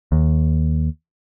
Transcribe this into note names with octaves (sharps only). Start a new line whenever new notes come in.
D#2